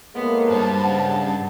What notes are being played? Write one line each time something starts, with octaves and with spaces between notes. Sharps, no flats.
A2 G#3 A#3 B3
G2 C5 A5
C#3 F#5